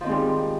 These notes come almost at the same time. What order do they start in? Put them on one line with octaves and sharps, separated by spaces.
F3 D#3 C4 G#3 G3